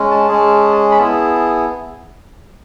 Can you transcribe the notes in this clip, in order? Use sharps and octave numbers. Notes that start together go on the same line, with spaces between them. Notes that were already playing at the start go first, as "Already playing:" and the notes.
Already playing: G#3 C#4
A5
G#3 C#4 G#4
B5
B3 E4 G#4 A5